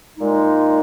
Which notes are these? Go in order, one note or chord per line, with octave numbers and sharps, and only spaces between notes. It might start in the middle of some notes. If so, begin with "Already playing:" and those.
A#2 G#3 D#4